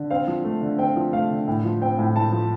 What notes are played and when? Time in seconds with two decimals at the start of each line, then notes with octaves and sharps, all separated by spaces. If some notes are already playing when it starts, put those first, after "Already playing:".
Already playing: D3
0.11 C4 F5
0.27 F3
0.45 A3
0.62 D3
0.79 C4 G5
0.96 F3
1.13 A3 F5
1.30 D3
1.48 A2
1.64 F3
1.82 C4 G5
1.99 A2
2.16 A2 A5
2.32 F3